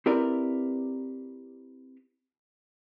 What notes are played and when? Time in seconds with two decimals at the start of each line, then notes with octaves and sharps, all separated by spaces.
0.06 C4 E4 G4 A#4 B4 D5